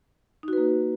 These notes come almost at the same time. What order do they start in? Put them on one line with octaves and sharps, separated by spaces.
D#4 F#4 B4 A#3